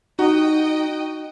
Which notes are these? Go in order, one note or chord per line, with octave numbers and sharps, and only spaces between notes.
D#4 F#4 D#5 G5